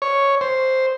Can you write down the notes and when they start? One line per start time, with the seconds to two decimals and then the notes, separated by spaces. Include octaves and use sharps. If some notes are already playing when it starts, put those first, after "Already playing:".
0.02 C#5
0.41 C5